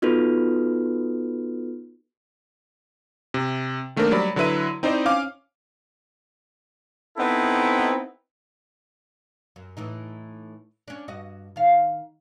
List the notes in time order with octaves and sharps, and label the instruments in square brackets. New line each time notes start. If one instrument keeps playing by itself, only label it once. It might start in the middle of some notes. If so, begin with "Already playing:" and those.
[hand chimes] B3 D#4 F4 F#4 A4 B4
[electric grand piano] C3
D#3 A3 A#3 D4 A#4 C5
F#3 G3 D5 B5
D3 F#3 E4 B4 E5 D#7
C4 D#4 E4 C5 D5 D#5
C#4 F5 D6
[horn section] B3 C4 D#4 E4 A4
[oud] F#2
A2 E3 D#4
C#4 D4
G2 F#4 D#5
D#3 F5